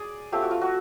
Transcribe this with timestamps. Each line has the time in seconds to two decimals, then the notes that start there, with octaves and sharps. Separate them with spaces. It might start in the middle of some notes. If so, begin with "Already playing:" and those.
Already playing: G#4 D5
0.32 A3 C4 F4 G4
0.42 F#4
0.51 F4
0.61 F#4